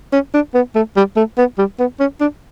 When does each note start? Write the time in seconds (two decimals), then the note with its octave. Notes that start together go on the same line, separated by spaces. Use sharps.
0.13 C#4
0.34 D4
0.55 B3
0.75 A3
0.97 G3
1.16 A3
1.38 B3
1.58 G3
1.79 B3
2.00 C#4
2.21 D4